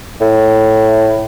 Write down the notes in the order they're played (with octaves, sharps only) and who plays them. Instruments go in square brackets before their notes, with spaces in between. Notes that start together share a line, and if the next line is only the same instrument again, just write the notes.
[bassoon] A2